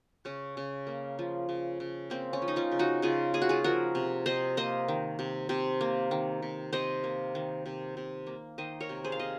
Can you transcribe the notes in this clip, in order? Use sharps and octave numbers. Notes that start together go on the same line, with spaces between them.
C#3 C#4
C#3
A#3
F3
C#3
C#3
A#3 C4
C#4
F3
D#4
C#4 F4
C#3
D#4 F#4
C#3 F4 G#4
A#3 G#4
F#4
F4 G#4
F3 F#4 A#4
C3
C3 C5 D#5
A#3 C5 D#5
D#3
C3
C3
A#3
D#3
C3
C3 C5 D#5
A#3
D#3
C3
C3
A#3
D#3 C5 D#5
A#4 C#5
C3
G#4 C5
F5
C3 D#5